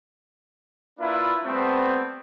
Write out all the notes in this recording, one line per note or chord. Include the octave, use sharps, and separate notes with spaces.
A#3 D4 E4 F4 B4
G3 A3 B3 C4